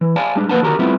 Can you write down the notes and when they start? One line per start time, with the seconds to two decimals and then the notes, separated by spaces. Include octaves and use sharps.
0.01 E3
0.16 D5 F5 G#5 A5
0.35 G3 G#3 D4
0.49 F2 A#3 B4 F#5 A5
0.62 D3 D#3 F#4 G4 A#4 A#5
0.79 G3 A3 B3 C4 E4 F4